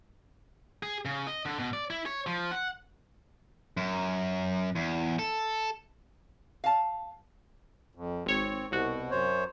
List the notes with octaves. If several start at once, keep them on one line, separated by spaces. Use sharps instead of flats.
G#4
C#3
D#5
D3
B2
D5
E4
C#5
F3
F#5
F#2
E2
A4
F5 A5
F2
G#1 C4 C#5
C2 B2 F#4
F#2 C5 C#5